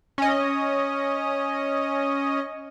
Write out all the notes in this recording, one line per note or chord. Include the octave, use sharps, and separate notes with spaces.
C#4 D#5